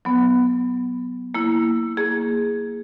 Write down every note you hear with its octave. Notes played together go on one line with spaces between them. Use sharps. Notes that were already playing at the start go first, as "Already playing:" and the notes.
F#3 B3
A#3 E4
A#3 G#4